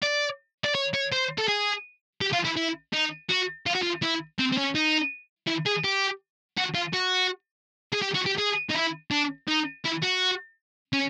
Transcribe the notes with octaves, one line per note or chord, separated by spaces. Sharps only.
D5
D5
C#5
C#5
C5
A4
G#4
G4
F4
E4
E4
D#4
F#4
F4
F#4
F4
E4
C4
C4
C#4
D#4
E4
G#4
G4
F#4
F4
F#4
G#4
G4
F#4
G4
G#4
D#4
E4
D4
D#4
E4
F#4
C#4